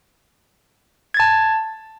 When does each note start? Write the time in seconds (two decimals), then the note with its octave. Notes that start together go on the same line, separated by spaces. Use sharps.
1.14 G#6
1.17 A6
1.20 A5